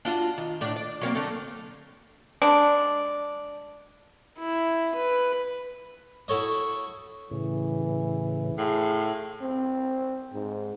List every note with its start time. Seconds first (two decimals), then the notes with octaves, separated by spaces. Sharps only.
0.05 D4 F4 F#4
0.38 D#3
0.61 A2 D4
0.76 D5
1.01 F#3 A#3 C4
1.15 D3 A3
2.42 G#3 D4
4.38 E4
4.95 B4
6.28 E4 F#4 A4 C#5 D#5
7.31 A2 C#3 E3
8.58 A2 G#4 F5 C6
9.41 C4
10.33 G#2